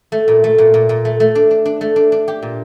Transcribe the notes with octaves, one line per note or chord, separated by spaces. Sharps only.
A3
A#2
A3
A#2
A#2
A#2
A3
A3
D4
D4
D4
A3
D4
D4
G4
A#2